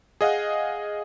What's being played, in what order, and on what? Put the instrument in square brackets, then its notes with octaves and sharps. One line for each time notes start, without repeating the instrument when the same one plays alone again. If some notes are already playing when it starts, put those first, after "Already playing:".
[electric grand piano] G#4 D#5 F5 F#5